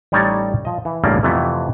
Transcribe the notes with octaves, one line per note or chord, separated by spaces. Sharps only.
A1 G3 D#4 C#5 D5 A5
F3 D#5
E3
A1 D2 G2 C#3 A#3 D5
F2 C3 E3 A3 B3